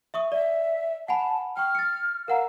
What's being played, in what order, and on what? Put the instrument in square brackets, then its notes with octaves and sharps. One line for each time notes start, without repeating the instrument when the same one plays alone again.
[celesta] E5 C#6 D#6
[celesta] D5 [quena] E5
[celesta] F#5 G#5 B5 [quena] A5
[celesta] G5 C#6 [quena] F6
[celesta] A6 C#7
[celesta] A#4 F#5 A#5 [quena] F5